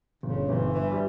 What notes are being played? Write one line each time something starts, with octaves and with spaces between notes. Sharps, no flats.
G1 C#3
G1 E3
G2 E3
G3